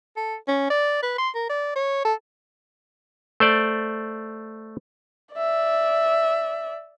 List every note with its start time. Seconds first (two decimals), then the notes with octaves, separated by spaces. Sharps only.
0.16 A4
0.48 C#4
0.70 D5
1.03 B4
1.18 C6
1.35 A#4
1.50 D5
1.76 C#5
2.05 A4
3.40 A3 C5 D5
5.35 D5 E5